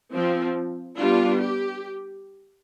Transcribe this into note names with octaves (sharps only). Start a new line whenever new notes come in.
F3 C4
G3 B3 D4 F4
G4